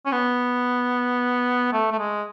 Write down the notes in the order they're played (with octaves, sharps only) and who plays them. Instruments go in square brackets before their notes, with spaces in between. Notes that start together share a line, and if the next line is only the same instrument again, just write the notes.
[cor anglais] C#4
B3
A3
A3
G#3